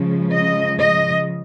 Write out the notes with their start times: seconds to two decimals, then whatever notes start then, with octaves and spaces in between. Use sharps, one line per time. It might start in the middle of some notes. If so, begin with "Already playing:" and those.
Already playing: C#3 F3 G#3
0.31 D#5
0.79 D#5